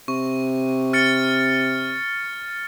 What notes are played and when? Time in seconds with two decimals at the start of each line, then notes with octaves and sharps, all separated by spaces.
0.08 C3 C#6
0.93 F6 A6 C#7